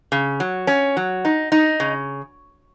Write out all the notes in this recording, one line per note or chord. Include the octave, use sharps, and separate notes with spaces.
C#3
F#3
C#4
F#3
D#4
D#4
C#3